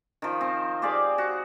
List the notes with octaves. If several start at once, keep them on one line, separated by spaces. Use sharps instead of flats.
D#3 F3
C4
G4 G#4 D5 F5
F#4